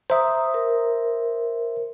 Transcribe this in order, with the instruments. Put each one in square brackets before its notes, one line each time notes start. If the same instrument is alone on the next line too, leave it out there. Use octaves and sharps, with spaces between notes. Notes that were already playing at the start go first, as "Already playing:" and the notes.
[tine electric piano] C5 E5 [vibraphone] A#5 D#6
[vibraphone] A#4